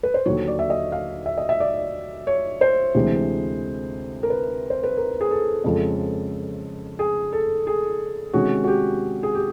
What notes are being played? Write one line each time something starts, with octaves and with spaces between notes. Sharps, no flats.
B4
C5
D#2 D3 F#3 C#5
D5
E5
D#5
F5
E5
D#5
E5
D5
C#5
C5
D2 C3 E3 G#3
A#4
B4
C5
B4
A#4
G#4
A4
F2 C#3 F3 G#3
G#4
A4
G#4
C3 D#3 G#3 C#4 F#4
F#4
G4
G#4
G4